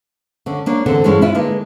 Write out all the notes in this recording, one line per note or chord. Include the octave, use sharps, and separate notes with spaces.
D3 C#4
A#3 D4 C#5
E2 D3 C4 A4
G2 E3 G#3 C#4 E4
C#4 E4 F4
D3 G#3 A#3 B4